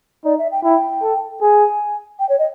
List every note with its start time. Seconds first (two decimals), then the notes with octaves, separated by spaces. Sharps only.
0.25 D#4 D5
0.38 E5
0.51 G5
0.64 E4 G5
1.02 A4
1.41 G#4 G#5
2.19 G5
2.29 C#5
2.39 D#5